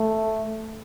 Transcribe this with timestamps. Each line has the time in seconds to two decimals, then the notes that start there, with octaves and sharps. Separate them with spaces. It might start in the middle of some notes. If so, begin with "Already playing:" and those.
Already playing: A3